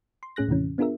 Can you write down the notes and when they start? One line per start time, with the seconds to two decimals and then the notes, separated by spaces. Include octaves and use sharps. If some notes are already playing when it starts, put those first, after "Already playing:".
0.23 C6
0.36 A2 C#4 G#4 F#6 A#6
0.48 D#2 A2 C3 E3 C#4
0.78 B3 D4 F4 G#4 A#4 E5